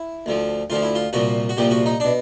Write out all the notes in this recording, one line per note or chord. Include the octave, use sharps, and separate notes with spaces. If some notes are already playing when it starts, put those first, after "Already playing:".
Already playing: E4
D2 D3 F3
D2 D3 F3 F4
E4
F4
C2 A#2 F3 F#4
F#4
C2 A#2 F3 G4
F#4
D#4
B2 D4